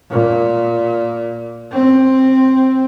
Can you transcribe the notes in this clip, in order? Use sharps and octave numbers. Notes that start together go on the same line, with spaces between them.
A#2
C4